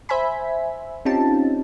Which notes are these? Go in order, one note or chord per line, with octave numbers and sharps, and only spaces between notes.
C5 E5 G#5 B5
C4 C#4 D#4 F4 G4 A5